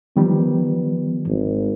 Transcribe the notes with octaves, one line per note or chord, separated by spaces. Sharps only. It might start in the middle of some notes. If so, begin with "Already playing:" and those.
D#3 F3 G3 B3
G#1